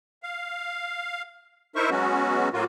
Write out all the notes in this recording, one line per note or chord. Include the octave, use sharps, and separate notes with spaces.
F5
D#4 E4 A#4 C5 E5 C#6
F#3 G#3 B3 C#4 F#4
A2 F#3 A#3 F4 F#4